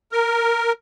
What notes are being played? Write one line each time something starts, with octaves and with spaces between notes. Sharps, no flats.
A#4